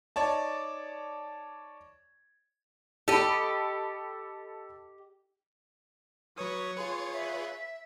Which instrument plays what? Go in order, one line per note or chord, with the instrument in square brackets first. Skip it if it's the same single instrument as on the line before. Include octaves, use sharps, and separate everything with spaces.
[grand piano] D#4 C#5 D5 A5
[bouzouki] G4 D#5 [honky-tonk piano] A4 B5
[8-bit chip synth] F#3 C#6 D#6 [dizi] B4 [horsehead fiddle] C#5
[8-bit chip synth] F4 G#4 B4 [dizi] C6
[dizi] E5